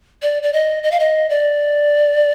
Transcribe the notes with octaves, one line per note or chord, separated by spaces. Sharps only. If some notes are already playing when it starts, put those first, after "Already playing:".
D5
D5
D#5
D#5
F5
D#5
D5